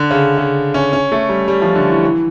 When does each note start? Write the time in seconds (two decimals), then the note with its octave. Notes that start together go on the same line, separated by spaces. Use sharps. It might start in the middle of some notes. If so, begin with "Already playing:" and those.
Already playing: D3
0.11 C#3
0.37 C#3
0.74 C#4
0.93 C#4
1.12 A3
1.29 G3
1.48 G3
1.62 F3
1.75 D3
1.89 E3
2.04 E3